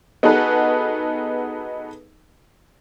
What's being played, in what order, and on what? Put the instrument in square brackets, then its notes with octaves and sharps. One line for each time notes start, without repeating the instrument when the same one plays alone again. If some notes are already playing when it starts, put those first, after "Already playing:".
[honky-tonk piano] B3 D#4 F#4 G#4 A4 B4